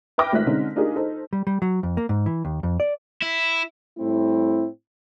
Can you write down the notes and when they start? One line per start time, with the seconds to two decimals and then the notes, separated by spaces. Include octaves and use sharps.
0.18 B4 E5 G5 D6 F6 A#6
0.32 G#1 A3 F4 E5 F#6 B6
0.46 D3 G#3 C4 C#4 D#4
0.76 D4 D#4 F4 G4 G#4 A#4
0.96 D#4 A4 C5
1.33 G3
1.47 G3
1.62 F#3
1.83 F2
1.97 A#3
2.09 G#2
2.26 E3
2.45 D#2
2.63 F2
2.80 D5
3.22 E4
3.97 A2 G3 A3 C4 E4